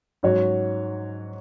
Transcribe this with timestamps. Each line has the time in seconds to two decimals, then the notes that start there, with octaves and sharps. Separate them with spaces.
0.23 G#2 F#3 C#4 F#4 C#5